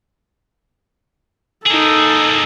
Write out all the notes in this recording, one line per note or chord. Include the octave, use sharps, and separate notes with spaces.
A#3 D#4 G#4 A4